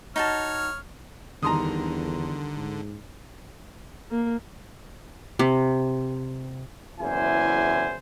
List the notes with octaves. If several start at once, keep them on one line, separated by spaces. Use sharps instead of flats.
D#4 F#4 C#5 A5 F6
E2 D3 D#3 G3 A#5 C6 D#6
G#2
A#3
C3
F#1 E2 E4 C5 G#5